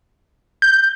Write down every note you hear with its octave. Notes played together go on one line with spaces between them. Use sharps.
G6